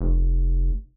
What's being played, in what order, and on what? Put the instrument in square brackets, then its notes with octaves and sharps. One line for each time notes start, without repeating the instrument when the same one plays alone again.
[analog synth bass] F1